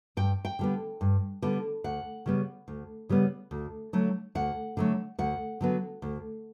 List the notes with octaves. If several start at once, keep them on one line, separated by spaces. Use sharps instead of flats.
G2 G5
G5
D3 G3 B3
G2
D3 G3 B3
D2 F#5
C#3 G3 B3
D2
C#3 G3 B3
D2
D3 F#3 A3
D2 F#5
D3 F#3 A3
D2 F#5
D3 F#3 B3
D2